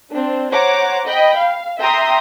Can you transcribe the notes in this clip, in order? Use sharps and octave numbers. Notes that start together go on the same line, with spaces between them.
C4 D4
C5 C#5 F#5 A#5 D6
D#5 G5 B5
F5
E5 G5 A#5 C6 D#6